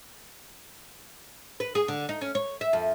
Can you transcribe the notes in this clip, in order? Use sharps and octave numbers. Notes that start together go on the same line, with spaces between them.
B4
G#4
D3
D#4
C#4
C#5
E5
F2